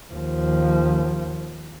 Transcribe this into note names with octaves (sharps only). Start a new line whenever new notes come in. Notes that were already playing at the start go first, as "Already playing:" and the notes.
D#2 F3